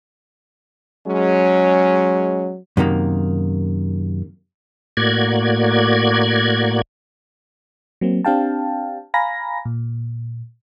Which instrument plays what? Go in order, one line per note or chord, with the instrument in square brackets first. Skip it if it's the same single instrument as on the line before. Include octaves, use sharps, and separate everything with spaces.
[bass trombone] F#3 [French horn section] G#3 C#4
[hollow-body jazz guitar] F#2 C3 D#3 A#3
[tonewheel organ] A2 A#3 F#4 D5 G#6
[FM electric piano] F#3 A#3 C4
C4 D4 G4 F5 G5 A5
F5 G#5 A#5 B5 A#6
A#2